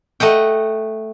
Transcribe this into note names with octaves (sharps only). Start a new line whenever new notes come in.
A3 D#5 F#5 G5